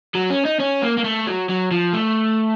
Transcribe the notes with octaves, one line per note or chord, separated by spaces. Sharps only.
F#3
C#4
D#4
C#4
A#3
A#3
A3
F#3
F#3
F3
A3